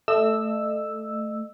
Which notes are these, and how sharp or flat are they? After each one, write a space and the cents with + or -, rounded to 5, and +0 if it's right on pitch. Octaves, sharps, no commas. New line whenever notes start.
A3 +0 D#5 -35 E6 +0